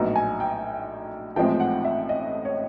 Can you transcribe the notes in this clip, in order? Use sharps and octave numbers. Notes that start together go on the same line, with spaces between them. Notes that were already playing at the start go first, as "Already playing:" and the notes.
Already playing: A#1 A2 F#3 B3 D#4 A#5
G#5
G5
A1 A2 F3 G#3 C4 G5
F#5
E5
D#5
C#5